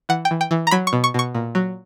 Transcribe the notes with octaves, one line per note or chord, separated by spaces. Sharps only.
E3 F#5
G5
E3
G5
E3
A#5
F#3 B5
C#6
B2
C#6
B2 C#6
A#2
F#3